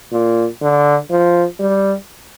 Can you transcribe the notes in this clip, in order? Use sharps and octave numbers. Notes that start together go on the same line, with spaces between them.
A#2
D3
F3
G3